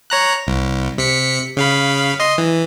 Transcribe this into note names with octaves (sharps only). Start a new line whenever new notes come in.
C#5 A#5 F#6
C2
C3 B6 C#7
C#3 F5 B5
D#5 C6
E3